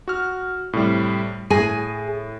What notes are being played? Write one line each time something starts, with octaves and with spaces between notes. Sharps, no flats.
F#4 F6
A2 C3 G3
A2 G#4 G#5 A#6 D#7